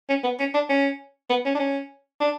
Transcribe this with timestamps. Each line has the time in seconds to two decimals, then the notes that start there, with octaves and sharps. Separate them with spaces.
0.09 C#4
0.24 B3
0.39 C#4
0.54 D4
0.69 C#4
1.30 B3
1.45 C#4
1.55 D4
1.59 C#4
2.21 D4